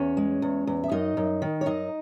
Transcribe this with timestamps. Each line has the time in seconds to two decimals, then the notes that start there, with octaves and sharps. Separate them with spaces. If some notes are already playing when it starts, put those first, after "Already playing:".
Already playing: E2 C#4 C#5
0.17 G#3
0.42 E2
0.67 E2
0.84 E5
0.92 F#2 D#4 D#5
1.17 F#2
1.42 D#3
1.61 C#5
1.66 F#2 D#4 D#5